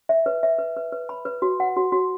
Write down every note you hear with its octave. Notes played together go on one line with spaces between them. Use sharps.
E5
B4
E5
B4
B4
B4
B5
B4
F#4
F#5
F#4
F#4